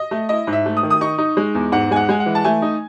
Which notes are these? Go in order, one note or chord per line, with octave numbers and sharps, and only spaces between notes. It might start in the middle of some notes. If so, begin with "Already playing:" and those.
Already playing: D#5
A3
E4 D#5
G#2
E5
A3
D#6
D#3
D#6
D#4 C#6
D#4
G#3
E2
G#2 F#5
G#3 G#5
F#5
G#3 G#5
F#5
E3
A5
A3 G#5
D#4